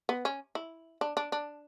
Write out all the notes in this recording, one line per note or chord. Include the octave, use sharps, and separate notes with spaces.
B3
C#4
E4
D4
D4
D4